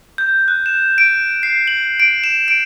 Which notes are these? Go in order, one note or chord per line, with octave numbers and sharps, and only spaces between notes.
G6
F#6
E7
D7
C7
F#7
D7
E7
D7